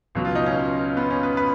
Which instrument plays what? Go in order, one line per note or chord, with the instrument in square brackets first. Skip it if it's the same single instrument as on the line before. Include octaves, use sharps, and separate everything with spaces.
[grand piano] C#2 B2 F#3
F4
D#4
C#4
B3
C#4
B4
B4